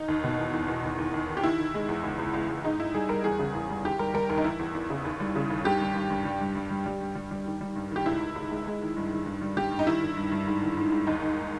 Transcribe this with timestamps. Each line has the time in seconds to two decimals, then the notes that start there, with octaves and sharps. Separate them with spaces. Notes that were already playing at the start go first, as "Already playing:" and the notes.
Already playing: D#3 D#4
0.08 D#2
0.24 B2
0.38 E2
0.53 E2
0.68 E2
0.84 D#2
0.98 D#2
1.14 D#2
1.29 D#3
1.37 G4
1.43 D#3 E4
1.59 D#3
1.74 G#3
1.89 E2
2.04 C#2
2.19 C#2
2.34 C#2
2.49 C#2
2.64 G#2 D#4
2.79 G#2 E4
2.94 G3 G#4
3.09 G3 A#4
3.24 E2 G#4
3.39 C#3
3.55 E2
3.70 G3
3.85 D#2 G4
3.99 G3 A#4
4.14 G3 A#4
4.30 D#2 A#4
4.37 D#4
4.44 E3 E4
4.59 E2
4.75 E2
4.90 C#3
5.05 D#2
5.20 G3
5.36 C#3
5.50 D#2
5.65 G2 G4
5.80 G2
5.95 G2
6.10 G2
6.25 G3
6.41 G2
6.55 G2
6.70 G3
6.86 G3
7.01 G2
7.15 G3
7.31 G3
7.46 D#3
7.61 G3
7.76 G2
7.91 D#3
7.96 G4
8.06 C#2 E4
8.21 C#2
8.36 C#2
8.51 G#3
8.67 G#3
8.82 D#3
8.97 G2
9.11 D#3
9.26 G2
9.42 G3
9.57 G3 G4
9.71 G2
9.79 D#4
9.86 D#3 E4
10.02 D#3
10.16 G2
10.32 G2
10.47 G#2
10.62 D#3
10.77 G#2
10.92 G#2
11.07 D#2 D#4
11.22 D#2